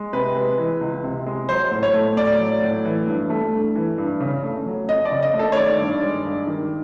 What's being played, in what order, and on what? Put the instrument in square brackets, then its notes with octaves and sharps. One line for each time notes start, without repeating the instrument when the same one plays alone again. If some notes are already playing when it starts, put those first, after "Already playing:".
Already playing: [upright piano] G#3
C3 B4
G#3
E3
C#2
C3
G#3
F#3 C5
A2
C#5
A3
A2 D5
F#3
A2
E3
G2
A3
G2
E3
G2
C#3
A3
F#3
F2 D#5
D5
C#3
D#5
A3
A4
C#5
D#3 D5
G2
G#3
G2
D#3